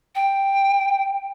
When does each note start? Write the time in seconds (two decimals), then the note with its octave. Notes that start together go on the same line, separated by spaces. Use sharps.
0.15 G5